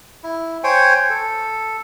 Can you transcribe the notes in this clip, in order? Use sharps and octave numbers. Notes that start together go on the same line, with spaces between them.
E4
C5 C#5 G5 G#5
A4